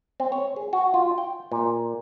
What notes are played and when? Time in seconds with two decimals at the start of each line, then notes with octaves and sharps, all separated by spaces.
0.20 C4
0.32 C#5
0.56 G#4
0.73 F#4
0.94 F4
1.18 G5
1.52 A#2